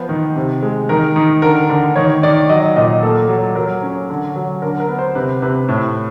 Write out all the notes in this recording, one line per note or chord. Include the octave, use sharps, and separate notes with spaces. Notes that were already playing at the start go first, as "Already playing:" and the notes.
Already playing: F3 B3 C5
D#3
C3
G#3
D#3 A#4
D#3
D3 A#4
D3 A#4
D#3 C#5
D#3 D5
F#3 D#5
A#2 D#5
A#3 A4
F#3
F#3 A#4
C#4
D3
F#3
D3 A#4
A#4
B3
C5
C3 B4
C3 B4
A2